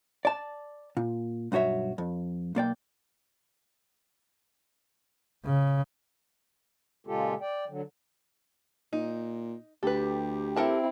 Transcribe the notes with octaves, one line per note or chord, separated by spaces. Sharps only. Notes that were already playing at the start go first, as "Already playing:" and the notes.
D5 A5
A#2
B1 G2 F#4 C#5 E5
F2
B1 A#3 D5 G5
C#3
A#2 C#3 G#3 F4 G4 A4
D5 G5
D3 F#3
A#2 D#4
D2 G4 A4 B4
C4 E4 A4 A#4 A5